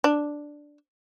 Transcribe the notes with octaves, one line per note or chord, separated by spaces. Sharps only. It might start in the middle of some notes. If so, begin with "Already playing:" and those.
D4